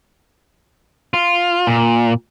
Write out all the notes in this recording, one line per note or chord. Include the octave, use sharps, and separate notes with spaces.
F4
A#2